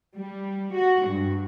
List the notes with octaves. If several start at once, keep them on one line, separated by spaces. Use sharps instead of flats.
G3
F#4
G2